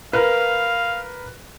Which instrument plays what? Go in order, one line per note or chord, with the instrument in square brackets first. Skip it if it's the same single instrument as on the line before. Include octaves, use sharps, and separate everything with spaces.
[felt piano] A#4 B4 [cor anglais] F5